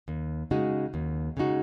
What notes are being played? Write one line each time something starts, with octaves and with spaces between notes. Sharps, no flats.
D#2
C#3 G#3 D#4 F#4
D#2
C#3 G#3 D#4 F#4